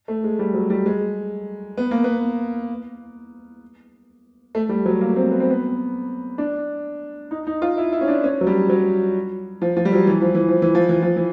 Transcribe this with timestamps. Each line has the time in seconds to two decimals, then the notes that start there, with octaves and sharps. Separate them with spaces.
0.08 A3
0.24 G#3
0.39 G3
0.54 F#3
0.70 G3
0.86 G#3
1.77 B3
1.91 A#3
2.04 B3
4.55 A3
4.69 G3
4.86 F#3
5.01 A#3
5.16 C4
5.31 B3
5.40 C4
5.50 B3
6.38 D4
7.31 D#4
7.47 D#4
7.62 F4
7.77 E4
7.93 E4
8.01 C#4
8.08 D4
8.24 C#4
8.41 F#3
8.47 G3
8.69 F#3
9.62 F3
9.77 F3
9.85 G3
9.93 F#3
10.07 E3
10.22 F3
10.35 E3
10.48 F3
10.62 E3
10.75 F3
10.89 E3
11.02 F3
11.16 E3